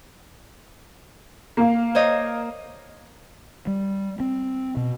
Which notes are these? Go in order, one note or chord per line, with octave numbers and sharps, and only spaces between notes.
A#3 F5
C5 C#5 D#5
G3
C4
B2